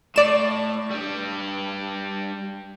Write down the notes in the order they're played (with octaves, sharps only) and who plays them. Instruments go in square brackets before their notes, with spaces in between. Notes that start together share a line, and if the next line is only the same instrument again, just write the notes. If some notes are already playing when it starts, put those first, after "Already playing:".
[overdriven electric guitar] A2 [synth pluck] D5 E7
[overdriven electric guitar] G2 G3